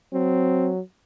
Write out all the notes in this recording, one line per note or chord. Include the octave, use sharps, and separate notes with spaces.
F#3 C4